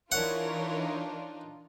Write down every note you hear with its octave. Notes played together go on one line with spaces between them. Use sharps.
E3 D4 D#4 F4 A#4 C#5 F#5